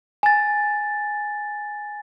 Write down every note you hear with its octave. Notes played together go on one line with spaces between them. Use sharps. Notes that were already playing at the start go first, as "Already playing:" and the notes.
G#5 A6